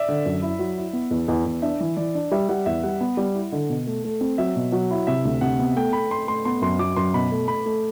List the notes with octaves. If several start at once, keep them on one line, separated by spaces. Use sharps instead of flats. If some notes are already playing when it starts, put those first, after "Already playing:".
Already playing: D5 E5
D3
F#2
E4
F#3
E4
B3
E2
E2
E2
D4 E5
E3
E3 D5
D4
G3 E5
G3 F#5
E2 E5
G3 F#5
B3
G3
E4
D3
B2
A3
A3
C4
F#3 E5
B2
F#3
E4
C3 E5
D2
C3 F#5
B3
A3 G5
A3 B5
A3 C6
A3 C6
B3 C6
F#2 C6
F#3 D6
F#2 C6
B2 B5
A3
A3 B5
A3